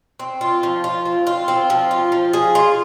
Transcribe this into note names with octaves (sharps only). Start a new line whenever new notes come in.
C4
F4
F3
F4
C4
F4
C4
F3
F4
F3
G#4
F4